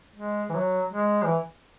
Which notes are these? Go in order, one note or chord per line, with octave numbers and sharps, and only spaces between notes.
G#3
E3
F#3
G#3
E3